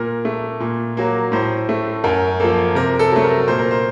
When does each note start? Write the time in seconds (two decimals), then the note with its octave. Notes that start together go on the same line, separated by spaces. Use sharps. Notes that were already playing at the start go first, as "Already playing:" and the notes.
Already playing: A#2 A#4
0.25 A3
0.60 A#2
0.97 F#3 A#3
1.32 A2 C5
1.69 A3
2.04 F#2 A#4
2.40 F3 A#3 A4
2.75 C3 A#4
2.99 A4
3.12 F#3 A3
3.24 A#4
3.48 A#2 C5
3.59 A#4
3.71 C5